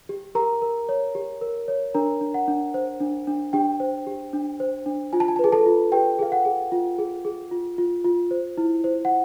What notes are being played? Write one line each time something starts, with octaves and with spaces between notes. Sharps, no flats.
G4
G4 A#4 A#5
A#4
C#5
G4
A#4
C#5
D4 A#4 A#5
D4
F#5
D4
C5
D4
D4
D4 G4 G5
C5
G4
D4
C5
D4
F4 G#5
A5
G#5
A5
G#4 B4 G#5
A4 A5
F4
G4 B4 G5
G#4 F5
F#5
G#4
F4
G#4
G#4
F4
F4
F4
C5
E4
C5
F#5